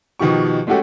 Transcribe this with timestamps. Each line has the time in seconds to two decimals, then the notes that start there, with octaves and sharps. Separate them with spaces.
0.19 B2 D#3 F3 G4 C#6
0.67 G#3 A3 C#4 F#4 G4 A4